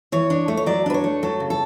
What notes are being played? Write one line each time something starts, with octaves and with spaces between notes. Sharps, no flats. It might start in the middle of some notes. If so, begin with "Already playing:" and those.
E3 C#5
D4
A3
C#5
F#3 D5
D4 B4
C#5
A3
F#3 A4
C#3
A4